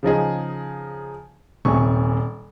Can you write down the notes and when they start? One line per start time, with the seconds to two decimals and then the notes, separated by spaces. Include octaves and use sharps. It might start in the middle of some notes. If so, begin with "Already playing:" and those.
0.03 C#3 F3 D#4 G#4
1.65 D#1 C3 G#5 C#6